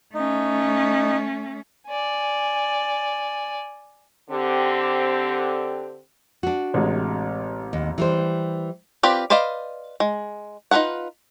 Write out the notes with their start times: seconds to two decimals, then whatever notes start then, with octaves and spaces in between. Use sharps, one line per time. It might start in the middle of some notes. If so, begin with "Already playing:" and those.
0.15 A3 C#4 D#4
1.88 D5 G#5
4.31 D3 C4 G4
6.43 D4 F#4
6.74 A1 C3 G#3
7.73 D#2
7.98 E3 G3 C5
9.03 C4 F4 G4 B4 D5
9.30 B4 C5 D5 D#5 F5
10.00 G#3
10.71 D#4 F4 A#4 B4 F#5